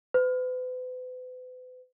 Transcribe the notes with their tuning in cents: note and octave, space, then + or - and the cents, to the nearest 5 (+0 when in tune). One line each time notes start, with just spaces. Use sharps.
B4 +40